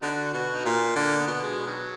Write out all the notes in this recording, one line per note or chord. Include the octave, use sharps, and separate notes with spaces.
D3 B3 D#4 F#4
B2 F#4
D#4
A#2 F4
D3 A#3
B3
B2
G#3
B2
D#3 F#3